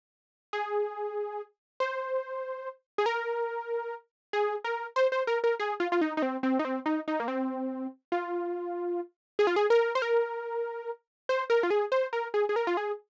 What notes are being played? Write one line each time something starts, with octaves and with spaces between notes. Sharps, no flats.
G#4
C5
G#4
A#4
G#4
A#4
C5
C5
A#4
A#4
G#4
F4
F4
D#4
D#4
C4
C4
D#4
C4
D#4
D#4
A#3
C4
F4
G#4
F4
G#4
A#4
C5
A#4
C5
A#4
F4
G#4
C5
A#4
G#4
G#4
A#4
F4
G#4